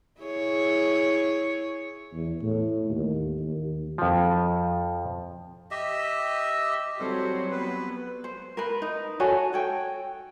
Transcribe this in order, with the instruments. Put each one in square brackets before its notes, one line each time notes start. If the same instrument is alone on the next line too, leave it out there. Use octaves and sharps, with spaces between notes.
[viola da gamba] E4 G#4 C#5
[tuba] E2
A2
D#2
D#2
[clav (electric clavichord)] F2 F3
[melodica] G4 D#5 E5 E6
[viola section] F#3 [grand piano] G3 C4 A4 [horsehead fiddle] C5 C#5
[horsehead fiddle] B3 [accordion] B4
[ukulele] C5
A#4 B4
D#4
F#4 A4 C#5 G#5
A4 C#5 G5